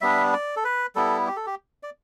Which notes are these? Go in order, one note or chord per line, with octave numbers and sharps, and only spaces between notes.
G3 B3 D4 E5
D5
A4
B4
G3 B3 E4 A4
G4
A4
G4
D5